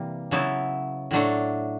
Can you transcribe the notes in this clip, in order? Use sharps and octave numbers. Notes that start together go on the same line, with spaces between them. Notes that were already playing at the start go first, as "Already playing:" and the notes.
Already playing: C3 E3 G3 A#3
C#3 F#3 B3 E4
A2 F#3 A3 D4